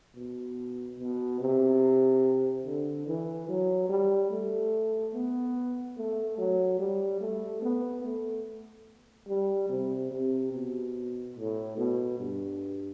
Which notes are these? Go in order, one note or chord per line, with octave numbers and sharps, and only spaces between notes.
B2
B2
C3
D3
E3
F#3
G3
A3
B3
A3
F#3
G3
A3
B3
A3
G3
C3
C3
B2
A2
B2
G2